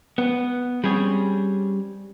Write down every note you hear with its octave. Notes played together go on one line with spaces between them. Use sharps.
B3
G3 C4 C#4 G#4